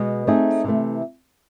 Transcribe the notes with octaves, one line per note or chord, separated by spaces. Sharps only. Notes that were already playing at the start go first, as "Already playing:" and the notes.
Already playing: B2 G#3 B3
A3 C4 D#4 G#4
C3 E3 A3